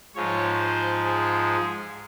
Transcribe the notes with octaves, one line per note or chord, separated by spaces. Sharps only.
G#2 F3 G#3 C#5
C5
G#4